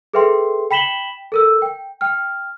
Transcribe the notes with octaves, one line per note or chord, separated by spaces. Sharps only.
G#4 A4 B4 E5 G5 C6
G5 B5 B6 E7 F#7 G7
A4 A#4 E6
G5
G5 F6